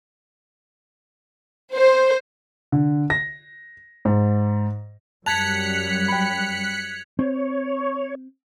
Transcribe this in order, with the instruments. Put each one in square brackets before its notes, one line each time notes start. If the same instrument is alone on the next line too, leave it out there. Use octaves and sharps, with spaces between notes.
[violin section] C5
[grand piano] D3
A#6
G#2
[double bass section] F#2 G3 [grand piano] A5 [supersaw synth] F#6 B6 C#7 [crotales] G#6 F7
[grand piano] G5 B5
[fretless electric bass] C4 [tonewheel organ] C#5